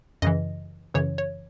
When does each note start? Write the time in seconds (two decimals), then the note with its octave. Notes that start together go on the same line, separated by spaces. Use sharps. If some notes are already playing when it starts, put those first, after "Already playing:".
0.22 F#2 C#3 E3 D#5
0.94 F#2 C#3 E3 C#5
1.18 C#5